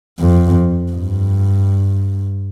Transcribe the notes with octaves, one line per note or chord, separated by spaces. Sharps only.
F2
G2